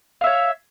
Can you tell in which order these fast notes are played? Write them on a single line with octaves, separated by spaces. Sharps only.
F5 E5 C#5